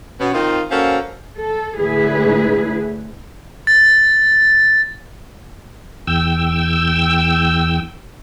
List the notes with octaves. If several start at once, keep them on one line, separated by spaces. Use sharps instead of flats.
B2 B3 C#4
D#3 C4 D#4 F4
A#3 C#4 F#4 A4 C5 F5
A4
A2 D3 E4 G#4 B4
A6
E2 G5 E6